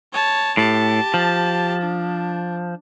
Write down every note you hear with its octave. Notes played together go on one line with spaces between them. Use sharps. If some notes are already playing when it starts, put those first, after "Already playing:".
C#5 A5
A2 G4 A5
F3
D4